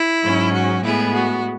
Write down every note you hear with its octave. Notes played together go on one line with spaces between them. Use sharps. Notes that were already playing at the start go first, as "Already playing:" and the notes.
Already playing: E4
G#2 F#3 C#4
F#4
A2 G#3 B3 E4 G#4
F#4